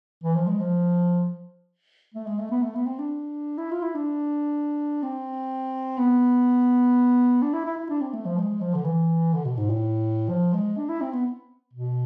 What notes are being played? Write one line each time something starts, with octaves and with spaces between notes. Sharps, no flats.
E3
F3
G#3
F3
A3
G#3
A3
B3
A3
B3
C4
D4
E4
F4
E4
D4
C4
B3
D4
E4
E4
E4
D4
C4
A3
F3
G#3
F3
D3
E3
D3
B2
G#2
A2
F3
G#3
D4
E4
C4
B3
B2